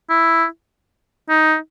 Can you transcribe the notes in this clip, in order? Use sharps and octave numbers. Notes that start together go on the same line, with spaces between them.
E4
D#4